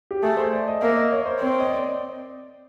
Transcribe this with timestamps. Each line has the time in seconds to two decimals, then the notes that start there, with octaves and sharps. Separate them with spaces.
0.11 G4
0.23 A3 G#4
0.37 C5
0.53 D5
0.68 D#5
0.81 A#3 E5
0.96 D#5
1.11 C#5
1.26 C5
1.40 C4 C#5
1.60 D#5
1.70 D5